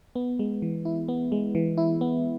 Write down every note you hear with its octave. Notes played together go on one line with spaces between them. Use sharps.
B3
G#3
E3
E4
B3
G#3
E3
E4
B3